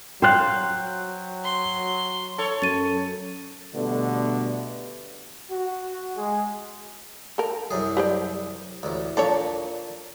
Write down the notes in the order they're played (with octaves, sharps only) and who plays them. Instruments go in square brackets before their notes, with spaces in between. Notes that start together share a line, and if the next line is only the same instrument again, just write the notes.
[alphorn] F#3 [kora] C5 F5 [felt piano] G5 F#6
[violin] C6
[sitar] A4 C#5
[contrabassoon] F#2 [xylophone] A6 D#7
[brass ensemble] B2 D3 G3 A3 B3
[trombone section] F#4
G#3
[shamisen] A4 A#4
[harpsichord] C2 F#2 G#4
[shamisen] G4 C5 D5
[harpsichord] A1 D2
[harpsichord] A#2 D5 [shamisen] D4 A4 C#5